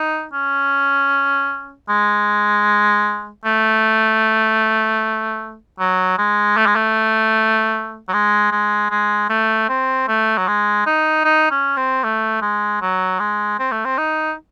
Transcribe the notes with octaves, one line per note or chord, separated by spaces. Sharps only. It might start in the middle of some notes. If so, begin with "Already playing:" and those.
Already playing: D#4
C#4
G#3
A3
F#3
G#3
A3
G#3
A3
F#3
G#3
G#3
G#3
A3
C4
A3
F#3
G#3
D#4
D#4
C#4
C4
A3
G#3
F#3
G#3
C4
A3
C4
D#4